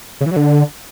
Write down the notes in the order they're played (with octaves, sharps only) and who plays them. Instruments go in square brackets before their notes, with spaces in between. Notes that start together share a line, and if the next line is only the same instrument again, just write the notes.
[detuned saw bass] C#3
E3
F#3
D3